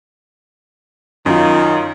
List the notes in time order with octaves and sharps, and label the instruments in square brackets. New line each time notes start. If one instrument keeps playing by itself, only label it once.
[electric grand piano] F#2 F4 [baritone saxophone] D#3